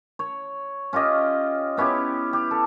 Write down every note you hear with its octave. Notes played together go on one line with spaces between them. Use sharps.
C#5
C#4 F4 G4 D#5
B3 C#4 E4 G4
G4
A4